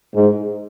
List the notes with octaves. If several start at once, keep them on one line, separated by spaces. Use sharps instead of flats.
G#2